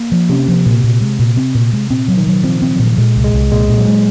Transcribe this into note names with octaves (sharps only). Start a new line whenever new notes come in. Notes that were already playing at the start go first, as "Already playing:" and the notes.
Already playing: A#3
F3
C3 C#4
F3
A#2
A#2
G#3
A#2
C4
A#2
G#3
A#2 C4
F#3
D#3
F#3
F3 C4
C4
F#3
A#2
A#2 G#3
C2
G#3
C2
A#2 G#3
A#2
F#3
G#3